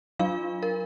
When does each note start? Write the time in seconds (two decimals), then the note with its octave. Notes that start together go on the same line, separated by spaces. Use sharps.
0.19 F#3 D4 F4 F5
0.63 A#4